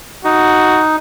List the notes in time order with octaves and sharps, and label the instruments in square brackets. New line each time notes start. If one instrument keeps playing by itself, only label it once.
[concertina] D#4 [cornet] F#4